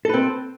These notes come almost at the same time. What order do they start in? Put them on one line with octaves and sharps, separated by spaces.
A4 B4 C4